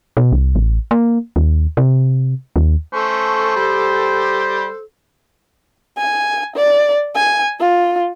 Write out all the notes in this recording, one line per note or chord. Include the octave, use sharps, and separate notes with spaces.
B2
C2
A1
A#3
D#2
C3
D#2
A3 C#4 A4 C5
G3 G4
G#5
D5
G#5
F4